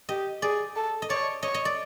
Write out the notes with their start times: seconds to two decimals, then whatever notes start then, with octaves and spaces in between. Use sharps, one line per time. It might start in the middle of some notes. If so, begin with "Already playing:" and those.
0.09 G4 D#5
0.42 G#4 D5
0.76 A4
1.02 D#5
1.09 C#5 D5
1.43 C#5 D#5
1.54 D#5
1.65 D5